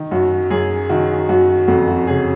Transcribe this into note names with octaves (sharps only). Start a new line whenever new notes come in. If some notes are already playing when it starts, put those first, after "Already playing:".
Already playing: D#3
F#2 F#4
F#2 G#4
D#3 F#4
F#2 F#4
F2 F#4
F#4
C#3 G#4